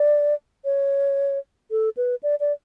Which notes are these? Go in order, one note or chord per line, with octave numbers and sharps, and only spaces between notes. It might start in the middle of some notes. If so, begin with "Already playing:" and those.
Already playing: D5
C#5
A4
B4
D5
D5